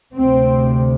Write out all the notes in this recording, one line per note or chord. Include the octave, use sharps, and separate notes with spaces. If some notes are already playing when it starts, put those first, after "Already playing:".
D2 C3 C4